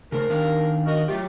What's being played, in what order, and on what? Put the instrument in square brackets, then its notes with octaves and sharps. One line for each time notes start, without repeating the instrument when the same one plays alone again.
[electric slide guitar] C#3 A3 C5 [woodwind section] A#4
[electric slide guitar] D#3 D4 F5
[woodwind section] F#4 A#4 D#5
[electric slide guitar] F#3 G4 [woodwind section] A3 F4